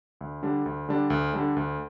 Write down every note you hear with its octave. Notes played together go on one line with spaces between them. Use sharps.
D2
D3 G3 D4
D2
D3 G3 D4
D2
D3 G3 D4
D2